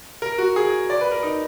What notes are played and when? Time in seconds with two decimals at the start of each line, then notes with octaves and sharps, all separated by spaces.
0.22 A#4
0.38 F#4
0.56 G#4
0.90 D5
1.01 B4
1.12 A#4
1.23 D#4